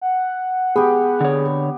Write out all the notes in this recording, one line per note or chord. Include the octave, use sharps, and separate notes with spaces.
F#5
B3 G4 G#4
D3 C#5